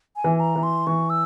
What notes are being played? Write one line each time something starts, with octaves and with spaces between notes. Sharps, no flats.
G#5
E3
A#5
E3
C6
E3 C#6
E6